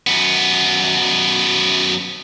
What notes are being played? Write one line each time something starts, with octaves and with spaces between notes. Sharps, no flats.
F#2 B3